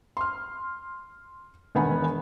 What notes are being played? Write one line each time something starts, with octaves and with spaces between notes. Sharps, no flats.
C6 F6
E1 D#3 B3 F#5 G#5 B5